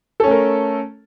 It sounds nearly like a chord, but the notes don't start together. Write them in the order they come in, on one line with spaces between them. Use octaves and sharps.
A4 C#4 A3 A#4